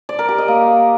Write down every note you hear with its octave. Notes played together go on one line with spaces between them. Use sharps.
D5
A#4
G4
D#5
A#3